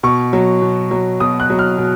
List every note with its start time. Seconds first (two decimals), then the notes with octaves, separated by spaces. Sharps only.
0.03 B2 C#6
0.33 F#3
0.62 B2
0.91 F#3
1.20 B2 D#6
1.40 F#6
1.50 F#3
1.59 F6
1.78 B2